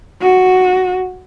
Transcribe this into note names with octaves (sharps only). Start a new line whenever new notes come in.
F#4